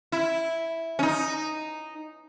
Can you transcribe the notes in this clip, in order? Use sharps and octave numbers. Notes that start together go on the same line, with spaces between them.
E4
C#4
D#4